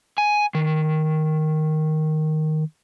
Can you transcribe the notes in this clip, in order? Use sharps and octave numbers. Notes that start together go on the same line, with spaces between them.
G#5
D#3